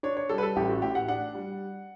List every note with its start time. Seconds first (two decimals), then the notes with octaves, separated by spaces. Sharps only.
0.03 D4 C#5
0.17 C#5
0.29 G3 A4
0.38 B4
0.43 A4
0.56 A1 G4
0.69 F#4
0.82 A2 G4
0.95 F#5
1.08 D4 F#5
1.35 G3